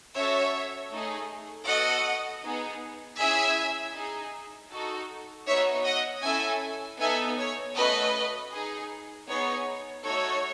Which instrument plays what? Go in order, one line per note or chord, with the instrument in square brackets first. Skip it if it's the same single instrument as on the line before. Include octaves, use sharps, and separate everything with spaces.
[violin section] C#4 F#4 A4 C#5 E5
A3 D#4 G#4
B3 F#4 A4 D#5 F#5
B3 D#4 G#4
C#4 E4 G#4 E5 G#5
D#4 G#4
D#4 F#4 A4
B3 D#4 F#4 C#5 E5
D#5 F#5
C#4 E4 A4 E5 G#5
B3 D#4 A4 E5 G#5
C#5
A3 C#4 F#4 A4 B4 D#5
D#4 G#4
B3 D#4 G#4 C#5
A3 D#4 F#4 A4 C#5